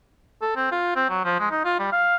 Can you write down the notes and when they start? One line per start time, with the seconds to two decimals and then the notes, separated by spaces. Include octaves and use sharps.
0.42 A4
0.56 C4
0.72 F4
0.96 C4
1.10 F#3
1.25 F3
1.40 G#3
1.51 D#4
1.65 F4
1.79 G3
1.92 F5